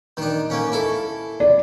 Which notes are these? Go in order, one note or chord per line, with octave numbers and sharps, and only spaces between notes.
D#3 D4
A#3 C#4
E4 A4
D5